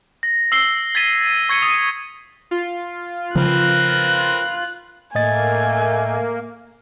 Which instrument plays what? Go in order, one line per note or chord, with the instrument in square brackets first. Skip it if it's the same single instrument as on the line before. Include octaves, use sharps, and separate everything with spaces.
[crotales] A#6
E6 C7 G7
G#6 A6 B6 D#7 G7
C#6 G#6 C#7 G7
D#6
[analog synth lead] F4
[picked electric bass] C#3 F3 [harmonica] C4 A#4 B4 [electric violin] F#6
[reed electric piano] A2 D#5 A6 [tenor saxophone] A3 [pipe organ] A#3 [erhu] G#5